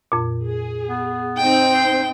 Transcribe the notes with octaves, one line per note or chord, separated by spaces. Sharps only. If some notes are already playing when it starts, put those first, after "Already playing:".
F2 A#2
G#4
B3
C4 D#4 G5
C5